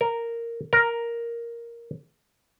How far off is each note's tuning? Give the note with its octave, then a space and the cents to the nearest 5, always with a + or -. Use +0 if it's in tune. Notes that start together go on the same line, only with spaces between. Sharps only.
A#4 -5
A#4 +5